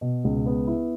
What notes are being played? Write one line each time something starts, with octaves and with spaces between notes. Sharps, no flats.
B2
C#2
B3
E4